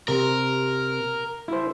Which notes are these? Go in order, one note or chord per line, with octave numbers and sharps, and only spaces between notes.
C3 A#4
E4 C5